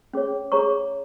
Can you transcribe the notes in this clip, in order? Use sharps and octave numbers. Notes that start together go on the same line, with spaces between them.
C#4 G#4 C#5
C#4 G#4 C#5 A#5 C#6